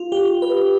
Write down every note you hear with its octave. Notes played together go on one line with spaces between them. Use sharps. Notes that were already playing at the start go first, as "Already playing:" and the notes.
Already playing: F4
G4
B4